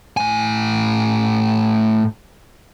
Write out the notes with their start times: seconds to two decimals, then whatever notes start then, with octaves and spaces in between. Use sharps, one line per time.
0.17 A2 G#5